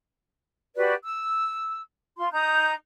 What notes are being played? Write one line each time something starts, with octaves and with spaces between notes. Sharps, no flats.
F#4 G4 B4 D5
E6
F4 C6
D#4 A#5 D#6 G6